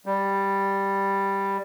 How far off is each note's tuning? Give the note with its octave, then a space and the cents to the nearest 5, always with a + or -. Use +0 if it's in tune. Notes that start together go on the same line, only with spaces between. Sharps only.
G3 +5